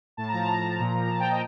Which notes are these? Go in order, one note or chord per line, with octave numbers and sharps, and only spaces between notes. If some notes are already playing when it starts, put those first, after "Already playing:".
A2 A5
F3 A#5
A5
A2 A#5
F3
A#2
F3
A#2 A5
G5
F3
D#5